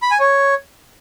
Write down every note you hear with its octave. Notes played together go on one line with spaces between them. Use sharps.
B5
G#5
C#5